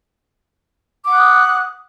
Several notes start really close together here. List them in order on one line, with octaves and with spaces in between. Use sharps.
D6 F#5 F#6 D#6